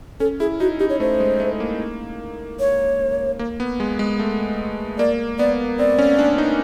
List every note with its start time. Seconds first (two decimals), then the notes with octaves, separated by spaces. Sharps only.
0.20 C#4 A4
0.40 E4 G#4
0.60 D#4 F#4
0.80 D#4 G4
0.90 C#5
1.00 A3 C5
1.20 G#3
1.40 A3
1.60 A#3
2.60 C#5
3.39 A#3
3.60 B3
3.80 G#3
3.99 G#3
4.19 A3
4.98 A#3 D5
5.39 B3 D5
5.79 C4 D5
5.99 C#4
6.19 D4
6.38 D#4